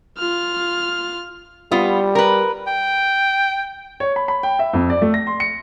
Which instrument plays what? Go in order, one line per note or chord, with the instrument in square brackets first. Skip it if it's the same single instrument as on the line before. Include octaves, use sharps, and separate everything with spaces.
[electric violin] F4 F6
[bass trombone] G3 [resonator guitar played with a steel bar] B3 F4
[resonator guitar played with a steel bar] A#4 B4
[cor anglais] G5
[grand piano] C#5
B5
B5
G5
E5
F2
D5
A3
A#6
C6
C#7